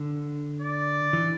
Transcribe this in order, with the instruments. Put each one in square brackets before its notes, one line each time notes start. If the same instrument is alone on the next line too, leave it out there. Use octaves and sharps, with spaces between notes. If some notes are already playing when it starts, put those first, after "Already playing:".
Already playing: [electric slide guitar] D3
[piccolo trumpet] D5
[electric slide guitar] E3